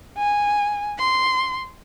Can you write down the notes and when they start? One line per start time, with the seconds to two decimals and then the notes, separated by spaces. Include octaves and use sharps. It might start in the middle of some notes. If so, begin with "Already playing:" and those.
0.18 G#5
0.98 C6